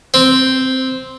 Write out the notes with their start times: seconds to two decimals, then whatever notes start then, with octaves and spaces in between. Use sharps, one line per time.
0.14 C4